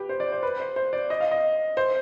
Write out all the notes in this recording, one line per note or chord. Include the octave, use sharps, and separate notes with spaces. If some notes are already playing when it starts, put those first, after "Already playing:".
Already playing: G4 B4
C5
D5
C5
B4
C5
C5
D5
D#5
F5
D#5
C5